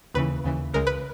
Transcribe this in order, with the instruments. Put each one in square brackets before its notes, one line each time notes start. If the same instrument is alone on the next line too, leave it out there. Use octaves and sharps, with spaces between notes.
[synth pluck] D#2 C#3 E3 B4
D#2 C#3 E3
C#2 C#3 G#3 A#4
B4